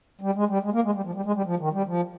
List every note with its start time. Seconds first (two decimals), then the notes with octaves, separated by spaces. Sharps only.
0.21 G3
0.35 G#3
0.49 G3
0.63 G#3
0.73 A#3
0.84 G#3
0.94 G3
1.04 F3
1.14 G3
1.25 G#3
1.35 G3
1.45 F3
1.59 D#3
1.73 G3
1.87 F3